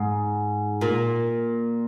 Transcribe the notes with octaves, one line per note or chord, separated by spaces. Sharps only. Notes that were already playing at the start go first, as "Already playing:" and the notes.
Already playing: G#2
A#2